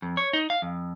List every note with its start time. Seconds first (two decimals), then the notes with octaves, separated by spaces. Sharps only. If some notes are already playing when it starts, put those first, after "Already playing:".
0.02 F2
0.17 C#5
0.33 D#4
0.50 F5
0.62 F2